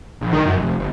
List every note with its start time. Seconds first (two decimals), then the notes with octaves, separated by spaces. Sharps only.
0.21 A#1
0.33 D#3
0.46 F#2
0.58 F1
0.78 G1